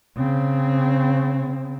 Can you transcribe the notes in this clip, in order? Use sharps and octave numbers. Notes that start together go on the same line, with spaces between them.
C#3 C4